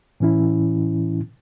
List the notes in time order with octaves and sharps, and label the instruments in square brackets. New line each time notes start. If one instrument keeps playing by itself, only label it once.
[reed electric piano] A2 E3 C#4 E4